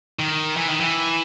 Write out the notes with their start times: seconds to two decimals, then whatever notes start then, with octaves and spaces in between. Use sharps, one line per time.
0.19 D#3
0.56 E3
0.68 D#3
0.80 E3